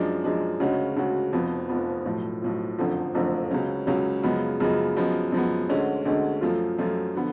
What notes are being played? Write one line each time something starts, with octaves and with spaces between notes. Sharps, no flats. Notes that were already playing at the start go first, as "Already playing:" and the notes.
Already playing: F#2 F3 G#3 D4
F#2 F3 G#3 D4
D2 C#3 G#3 C#4 F#4
D2 C#3 G#3 C#4 F#4
F1 F2 F3 B3
F1 F2 F3 B3
B1 A2 F3
B1 A2 F3
F#1 F2 D3 F3 A3
F#1 F2 D3 F3 A3
C#2 C#3 F#3 C#4
C#2 C#3 F#3 C#4
F#2 C#3 F3 G#3 B3
F#2 C#3 F3 G#3 B3
F#2 F3 G#3 B3
F#2 F3 G#3 B3
D2 D3 G#3 C#4
D2 D3 G#3 C#4
F#2 F3 A3 F4
F#2 F3 A3 F4
D3 F3 B3